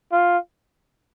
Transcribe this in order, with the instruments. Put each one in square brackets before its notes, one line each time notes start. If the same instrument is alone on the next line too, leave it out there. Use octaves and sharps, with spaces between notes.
[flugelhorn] F4